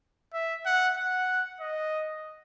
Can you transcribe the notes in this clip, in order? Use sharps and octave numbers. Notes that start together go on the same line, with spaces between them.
E5
F#5
F#5
D#5